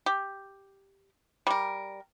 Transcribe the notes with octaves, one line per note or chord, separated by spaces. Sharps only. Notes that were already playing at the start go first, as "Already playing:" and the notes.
G4
G3 A#4